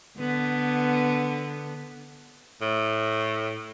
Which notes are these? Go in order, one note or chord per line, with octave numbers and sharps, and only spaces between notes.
D3 B3
A2